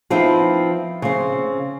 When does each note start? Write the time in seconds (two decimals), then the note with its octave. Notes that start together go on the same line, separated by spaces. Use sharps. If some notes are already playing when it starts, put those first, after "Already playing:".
0.10 F3 B3 C4 D#4 E4
1.02 C#3 C4